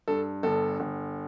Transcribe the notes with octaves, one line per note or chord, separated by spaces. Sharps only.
G2 A4
G1 A4
G1